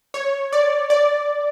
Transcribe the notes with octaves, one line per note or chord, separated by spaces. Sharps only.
C#5
D5
D5